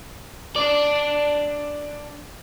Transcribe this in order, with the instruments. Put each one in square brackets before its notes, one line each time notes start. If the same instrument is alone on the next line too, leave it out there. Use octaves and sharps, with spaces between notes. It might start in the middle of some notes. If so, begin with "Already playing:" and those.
[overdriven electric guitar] D4 D5